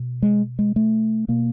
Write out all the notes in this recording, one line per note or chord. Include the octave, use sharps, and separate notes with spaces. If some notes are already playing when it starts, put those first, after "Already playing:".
Already playing: B2
G#3
G#3
A3
B2 A#3